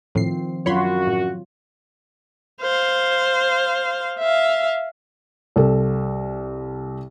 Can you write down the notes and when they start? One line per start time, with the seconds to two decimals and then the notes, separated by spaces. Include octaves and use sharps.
0.15 A2 D#3 F3 C4 C7
0.66 F#2 F#3 F4 F#4 C#5 B5 C6
1.07 A2
2.61 C5 F5
4.19 E5 F5
5.56 C2 A4